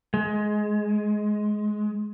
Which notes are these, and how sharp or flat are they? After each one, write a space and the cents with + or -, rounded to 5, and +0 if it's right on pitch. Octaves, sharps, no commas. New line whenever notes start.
G#3 +15